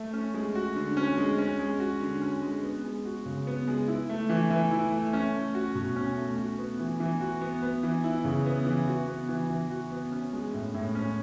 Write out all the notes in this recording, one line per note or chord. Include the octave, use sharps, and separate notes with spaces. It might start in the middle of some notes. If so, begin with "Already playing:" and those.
Already playing: A3
C#4
G#3
F#4
D3
C#4
G#3
C#4
G#3
F#4
D3
C#4
G#3
B3
G#3
F#4
C#3
B3
G#3
E4
A3
E3
E3
E4
A3
C#4
A3
F#4
B2
C#4
A3
F#4
B3
E3
E3
F#4
B3
B3
E3
E4
C#3
B3
E3
F#4
B3
E3
E3
F#4
B3
C#4
G#3
A2
A2
C#4